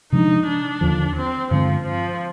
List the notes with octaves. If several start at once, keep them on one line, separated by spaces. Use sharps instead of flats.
C3 F3 G#3 D4 D#4
D4
D#2 D3 F3
C4
G2 D3 F3 G#3 C4
F3